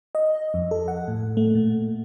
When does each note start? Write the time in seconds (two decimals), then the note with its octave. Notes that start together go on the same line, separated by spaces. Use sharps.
0.15 D#5
0.54 F2
0.71 A4
0.88 F#5
1.08 A2
1.37 A3
1.55 A#2